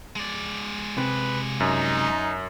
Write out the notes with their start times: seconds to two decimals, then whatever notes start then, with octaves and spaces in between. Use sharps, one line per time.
0.16 G#3 D5
0.98 C3 B4
1.60 F#2 D#4